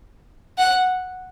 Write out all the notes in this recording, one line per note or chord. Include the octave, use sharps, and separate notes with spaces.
F#5